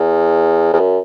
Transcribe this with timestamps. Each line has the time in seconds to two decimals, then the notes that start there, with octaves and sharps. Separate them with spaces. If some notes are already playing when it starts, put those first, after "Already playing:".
Already playing: E2
0.73 E2
0.79 F#2